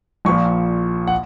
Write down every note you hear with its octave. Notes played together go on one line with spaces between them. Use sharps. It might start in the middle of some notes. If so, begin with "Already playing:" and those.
A#1 A#2 F3 C#6
F#5